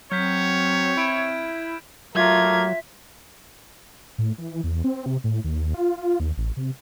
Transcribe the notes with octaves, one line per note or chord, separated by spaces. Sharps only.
F#3 C4 C#5 F6 G6 B6
E4 G#6 D7 E7
F#3 A3 A#3 F4 A#4 E5 G#6
A2
E3
E2
C4
C3
A2
D#2
F4
F4
D#2
A1
C3